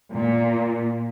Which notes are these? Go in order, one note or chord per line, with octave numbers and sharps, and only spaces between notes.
A#2